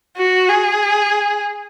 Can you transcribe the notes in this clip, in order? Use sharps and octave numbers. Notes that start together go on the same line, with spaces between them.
F#4
G#4